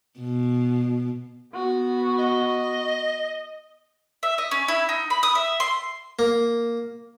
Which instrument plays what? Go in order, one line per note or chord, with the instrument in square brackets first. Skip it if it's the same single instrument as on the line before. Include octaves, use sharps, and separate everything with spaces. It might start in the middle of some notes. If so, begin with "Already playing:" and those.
[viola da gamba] B2
[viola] B3 F#4
[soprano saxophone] D#5
[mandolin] E5
D#5
C#4
E4
D#4
B5
D#6
E5
C6
[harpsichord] A#3